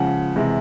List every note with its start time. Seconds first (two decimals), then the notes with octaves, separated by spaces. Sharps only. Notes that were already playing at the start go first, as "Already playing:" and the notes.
Already playing: C#3 F3 G#3 F#5
0.36 C3 E3 G#3